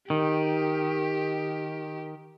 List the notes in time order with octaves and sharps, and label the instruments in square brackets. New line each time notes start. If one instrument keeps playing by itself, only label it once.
[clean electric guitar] D#3 [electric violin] G4